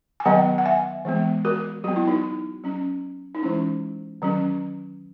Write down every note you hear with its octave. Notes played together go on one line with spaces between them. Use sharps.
G#5
D#3 F#3 B3 D#5 F#5
F#5
E5 G#5
E3 G#3 B3
F#4 A#4
F#3 B3 F#4
E4
D#4 F#4
F#3 C#4
D#4
E3 G#3 C#4 E4
D#3 F#3 C#4